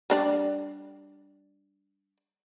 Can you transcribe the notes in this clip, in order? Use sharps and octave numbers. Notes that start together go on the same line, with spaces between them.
G3 D4 D5